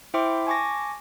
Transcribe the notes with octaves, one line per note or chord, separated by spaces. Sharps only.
E4 C5 E5 G5 C6 D6
G#5 A5 C#6 D6 A#6